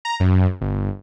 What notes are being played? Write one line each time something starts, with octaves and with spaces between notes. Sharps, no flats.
A#5
F#2
G1